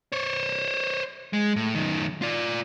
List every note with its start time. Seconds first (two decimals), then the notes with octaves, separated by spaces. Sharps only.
0.12 C5 C#5
1.33 G#3
1.56 A2
1.75 F#2 D#3
2.22 F4 D5